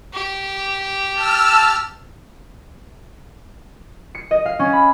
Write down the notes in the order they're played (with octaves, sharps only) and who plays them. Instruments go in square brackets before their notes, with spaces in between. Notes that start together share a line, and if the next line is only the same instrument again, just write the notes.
[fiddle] G4
[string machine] A5 E6 F6
[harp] C#7
D#5
F5
C#4
B5